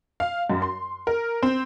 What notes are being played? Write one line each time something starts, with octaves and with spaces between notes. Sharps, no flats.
F5
F#2
C6
A#4
C4